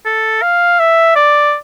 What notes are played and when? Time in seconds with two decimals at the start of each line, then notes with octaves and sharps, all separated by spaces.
0.05 A4
0.42 F5
0.80 E5
1.16 D5